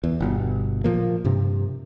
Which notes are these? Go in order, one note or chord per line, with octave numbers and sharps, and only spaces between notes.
E2
G1 B2
A#2 F3 A#3
G2 C3